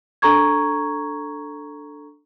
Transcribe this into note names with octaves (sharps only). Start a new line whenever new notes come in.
D4 A4 A#5 C#6 G#6